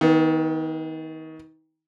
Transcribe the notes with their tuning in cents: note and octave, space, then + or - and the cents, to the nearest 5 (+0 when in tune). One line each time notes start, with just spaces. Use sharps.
D#3 +30 B3 -5